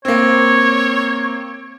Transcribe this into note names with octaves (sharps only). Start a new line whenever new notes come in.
A#3 C4 C#5